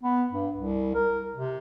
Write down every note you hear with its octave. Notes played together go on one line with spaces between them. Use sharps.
B3
G2
C2
A#4
C3